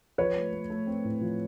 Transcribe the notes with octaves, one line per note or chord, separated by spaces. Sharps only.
F3 B4 C#5
A3
A3
A3
C4
A2
F3